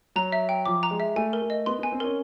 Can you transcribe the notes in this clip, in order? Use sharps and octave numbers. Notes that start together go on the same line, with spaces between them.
F#3 A#5
E5
G5
F3 D6
A#5
G#3
E5
A3 G#5
A#4
A3
D#5
B3 C6
B3 G#5
C4
C#4 A#4